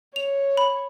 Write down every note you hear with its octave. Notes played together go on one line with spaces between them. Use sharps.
C#5 F7
B5